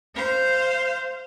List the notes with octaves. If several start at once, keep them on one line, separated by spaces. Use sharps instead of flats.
C5 F5